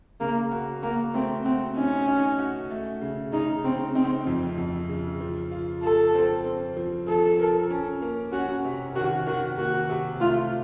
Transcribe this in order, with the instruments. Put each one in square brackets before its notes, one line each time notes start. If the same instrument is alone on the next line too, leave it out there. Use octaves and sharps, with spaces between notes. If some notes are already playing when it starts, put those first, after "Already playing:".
[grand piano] C#3 [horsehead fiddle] A#3
[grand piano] F#4
[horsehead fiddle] A#3 [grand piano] F#4
[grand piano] A3 [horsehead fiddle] C4
[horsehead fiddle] C4 [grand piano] F#4
[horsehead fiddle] C#4 [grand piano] D#4
[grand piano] D#4
F#4
A3
C#3
[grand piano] C#3 [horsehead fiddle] D#4
[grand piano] C#3 [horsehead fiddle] C4
[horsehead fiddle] C4 [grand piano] D#4
[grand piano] F2
F2
C#3
F3
F4
[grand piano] F4 [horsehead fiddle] A4
[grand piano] C4
C4
F3
[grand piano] F3 [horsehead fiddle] A4
[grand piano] A#4
C#4
A#3
[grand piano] C#4 [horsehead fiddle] F#4
[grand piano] C3
[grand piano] D#3 [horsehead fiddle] F#4
[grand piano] D#3 [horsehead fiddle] F#4
[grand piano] A#3 [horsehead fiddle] F#4
[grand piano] C3
[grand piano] A3 [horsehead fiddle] F4